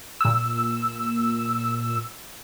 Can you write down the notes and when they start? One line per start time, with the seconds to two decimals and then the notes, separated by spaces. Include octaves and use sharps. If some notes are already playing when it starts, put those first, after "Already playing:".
0.21 A#2 E6